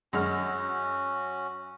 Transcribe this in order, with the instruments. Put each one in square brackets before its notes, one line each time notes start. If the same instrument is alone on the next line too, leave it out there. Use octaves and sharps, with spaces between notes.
[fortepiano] F#2 G#3 F6 [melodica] C#4 F#4